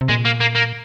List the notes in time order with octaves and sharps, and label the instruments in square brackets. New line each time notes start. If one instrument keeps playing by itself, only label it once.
[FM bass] C3
[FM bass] A#2 [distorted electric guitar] G#3
[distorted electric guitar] A#3
A#3
A#3